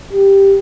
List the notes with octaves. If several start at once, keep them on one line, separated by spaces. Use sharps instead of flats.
G4